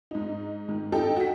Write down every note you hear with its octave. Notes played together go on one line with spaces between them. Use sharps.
G#2 D#4
G#2 D#3
D#4 A4 G5
F#4 B6